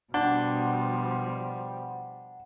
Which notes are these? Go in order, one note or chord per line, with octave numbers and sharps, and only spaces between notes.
B2 F3 G3 D4 F#5